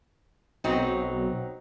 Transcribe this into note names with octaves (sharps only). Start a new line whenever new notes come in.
B1 F#3 C4 D#4